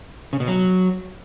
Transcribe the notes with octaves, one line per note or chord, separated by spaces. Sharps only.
C#3
B2
F#3